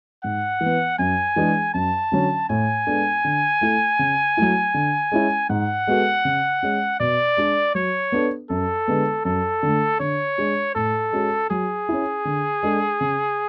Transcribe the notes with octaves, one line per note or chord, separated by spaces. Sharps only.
G#2 F#5
E3
B3
F#2 G#5
E3 G#3 D4 G#4
F#2 A5
D3 F#3 C#4
A2 G#5
G#3 B3 D4 A4
D3
A3 E4 A4
C#3
F#3 A3 E4
D3
G#3 C#4 E4
G#2 F#5
G#3 B3 F#4 A4
C#3
G#3 C#4
B2 D5
G#3 D4 G#4
F#3 C#5
B3 D4 A4
F#2 A4
D3 G#3 B3
F#2 A4
D3 A3
D3 C#5
G#3 D4 G#4
A2 A4
G#3 C#4 F#4
F#3 G#4
C#4 E4
D3
G#3 D4 A4
C#3